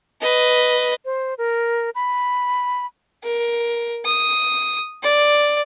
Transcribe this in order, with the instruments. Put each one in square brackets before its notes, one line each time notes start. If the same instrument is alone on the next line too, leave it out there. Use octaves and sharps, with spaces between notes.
[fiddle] B4 D#5
[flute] C5
A#4
B5
[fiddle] A#4
D#6
D5